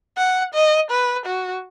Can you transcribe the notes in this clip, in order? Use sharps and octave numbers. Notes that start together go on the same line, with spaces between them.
F#5
D#5
B4
F#4